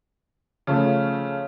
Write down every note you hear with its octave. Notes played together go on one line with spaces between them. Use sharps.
C#3 F3 A3